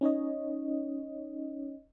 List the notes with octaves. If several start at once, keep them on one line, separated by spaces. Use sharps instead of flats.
C#4 D#4 C#5 D#5